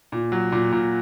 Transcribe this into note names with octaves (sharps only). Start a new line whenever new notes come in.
A#2
F#3
A#2
A#2